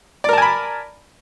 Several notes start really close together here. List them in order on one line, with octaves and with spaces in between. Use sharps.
D5 A#4 A5 G#5 B5